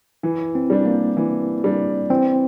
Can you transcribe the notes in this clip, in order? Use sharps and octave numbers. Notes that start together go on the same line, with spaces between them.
E3 E4
C4
G3 D4
A#3
E3
G3 D4
E3 C4